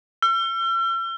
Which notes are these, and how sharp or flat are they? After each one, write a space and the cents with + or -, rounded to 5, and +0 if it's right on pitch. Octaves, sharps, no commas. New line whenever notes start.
E6 +45